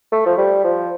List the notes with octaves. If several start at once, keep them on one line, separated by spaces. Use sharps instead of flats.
A3
F3
G3
F3